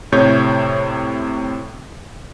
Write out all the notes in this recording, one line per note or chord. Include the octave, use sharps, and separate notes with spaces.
A2 C3 C#5 G6